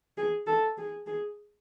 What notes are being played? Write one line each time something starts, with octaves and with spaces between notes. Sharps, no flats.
G#4
A4
G#4
G#4